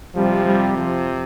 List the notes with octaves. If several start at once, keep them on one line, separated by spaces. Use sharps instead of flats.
F2 C3 F3 G3
G3
F3